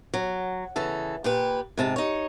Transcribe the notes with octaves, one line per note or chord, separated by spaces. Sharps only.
F#3
C#3 E3 A4
A#2 G4 B4
G#2 C3 A5
D#4 C#5